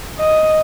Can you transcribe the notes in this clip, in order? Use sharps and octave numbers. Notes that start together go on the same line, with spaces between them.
D#5